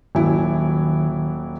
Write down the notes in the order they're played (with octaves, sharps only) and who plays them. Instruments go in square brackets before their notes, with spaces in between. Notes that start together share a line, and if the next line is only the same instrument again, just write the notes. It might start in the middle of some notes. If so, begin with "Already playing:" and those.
[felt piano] D#1 F#3 E4 [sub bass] D#3